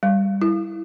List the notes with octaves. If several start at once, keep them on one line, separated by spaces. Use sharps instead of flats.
G3
E4